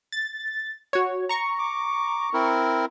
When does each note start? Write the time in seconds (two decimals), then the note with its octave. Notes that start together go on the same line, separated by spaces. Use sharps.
0.12 A6
0.93 F#4 C#5
1.29 A#5 C#6
1.59 D6
2.33 C4 E4 A#4